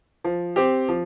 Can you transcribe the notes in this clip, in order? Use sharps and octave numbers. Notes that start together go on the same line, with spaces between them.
F3
C4 G4
F3